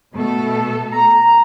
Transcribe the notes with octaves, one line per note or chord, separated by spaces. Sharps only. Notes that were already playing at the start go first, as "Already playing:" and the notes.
B2 A3 A4
A#5